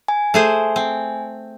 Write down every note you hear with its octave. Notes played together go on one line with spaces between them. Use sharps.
G#5
A3 G#4 C5
C4